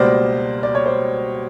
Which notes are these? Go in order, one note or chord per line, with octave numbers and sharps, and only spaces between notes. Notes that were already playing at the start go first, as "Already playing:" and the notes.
Already playing: C#2 B2 G3 A#3 C5 D5
D5
C#5
C5 D5